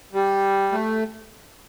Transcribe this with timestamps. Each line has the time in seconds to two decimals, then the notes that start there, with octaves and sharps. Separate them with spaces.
0.13 G3
0.72 A3